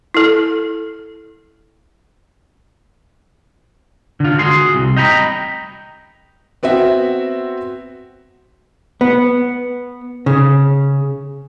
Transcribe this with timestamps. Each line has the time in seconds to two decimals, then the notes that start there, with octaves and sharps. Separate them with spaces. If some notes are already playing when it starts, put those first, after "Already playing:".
0.14 E4 A4
4.20 D3 F4
4.38 F#4 G#4 C6
4.74 C2
4.97 D#5 G5 A#5 B5
6.63 B3 C4 F#4 E5
9.01 B3
10.26 C#3